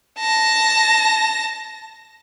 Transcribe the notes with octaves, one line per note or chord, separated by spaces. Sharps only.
A5 A#6